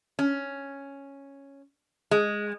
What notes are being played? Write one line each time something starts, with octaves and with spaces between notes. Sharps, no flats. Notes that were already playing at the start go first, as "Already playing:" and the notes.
C#4
G#3